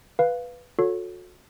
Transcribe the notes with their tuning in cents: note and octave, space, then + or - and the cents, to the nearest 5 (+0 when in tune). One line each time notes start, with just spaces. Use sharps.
B4 +0 F5 +0
F#4 -40 A4 +0 C#5 +0